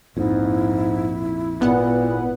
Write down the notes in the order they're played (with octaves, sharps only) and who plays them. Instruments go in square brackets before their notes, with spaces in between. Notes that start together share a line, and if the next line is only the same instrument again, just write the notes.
[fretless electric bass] A#1 F2 [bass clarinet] G#2 [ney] E4
[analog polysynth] G#1 B3 F#5 [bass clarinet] A#2